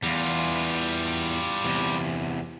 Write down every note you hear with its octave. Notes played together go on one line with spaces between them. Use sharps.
E2 G3 F4
E2 C3